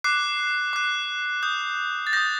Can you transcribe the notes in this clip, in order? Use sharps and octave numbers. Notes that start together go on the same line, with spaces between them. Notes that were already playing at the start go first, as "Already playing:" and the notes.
D6 F#6 C7
D6 F#6
D#6 G6
A6
D#6 G6 A#6